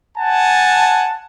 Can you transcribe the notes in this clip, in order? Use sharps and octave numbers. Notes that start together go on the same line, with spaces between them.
F#5 G#5 A5